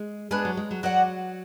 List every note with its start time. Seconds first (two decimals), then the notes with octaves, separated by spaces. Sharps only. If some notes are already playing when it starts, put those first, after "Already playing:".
Already playing: G#3
0.31 G#3 B3 D4 G#4
0.45 F#3
0.57 G#3
0.71 F#3
0.83 F#3 F#4 D5 F#5